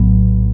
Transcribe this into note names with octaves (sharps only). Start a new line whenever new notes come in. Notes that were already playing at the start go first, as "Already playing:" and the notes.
Already playing: A#1 A2 F#3 B3